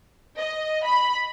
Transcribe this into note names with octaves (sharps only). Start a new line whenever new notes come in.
D#5
B5